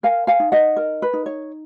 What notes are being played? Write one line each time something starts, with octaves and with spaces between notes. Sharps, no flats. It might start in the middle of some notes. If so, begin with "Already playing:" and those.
A#4 F5 G#5
F5 G#5
D#4
D#5 F#5
A#4
B4
D#4
C#5